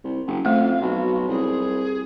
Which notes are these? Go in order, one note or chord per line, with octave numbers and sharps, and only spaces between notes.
C2
F#1
F2 A3 F5 F#5
B1 F#4
C2 G#4